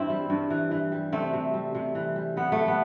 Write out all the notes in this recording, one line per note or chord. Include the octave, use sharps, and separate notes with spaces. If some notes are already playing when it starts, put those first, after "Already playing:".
Already playing: G2 E3 C4 E4
G3
G2
E3
E3
G3
C3 A3 C4
C3
G3
C3
E3
G3
C3 B3
A3
G3
B3